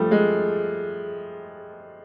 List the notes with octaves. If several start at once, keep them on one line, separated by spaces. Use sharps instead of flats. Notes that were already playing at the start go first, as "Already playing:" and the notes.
Already playing: F3 G3 A3
G#3